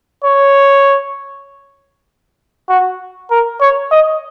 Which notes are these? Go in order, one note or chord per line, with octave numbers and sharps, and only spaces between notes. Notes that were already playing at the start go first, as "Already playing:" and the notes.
C#5
F#4
A#4
C#5
D#5